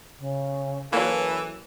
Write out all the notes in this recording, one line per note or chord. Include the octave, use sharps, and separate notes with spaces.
C#3
E3 F#3 A#3 C#4 E4 A4 B4